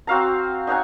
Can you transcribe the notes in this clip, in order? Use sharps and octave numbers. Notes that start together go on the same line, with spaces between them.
C4 F#4 F5 A#5
D#4 C#5 F#5 G#5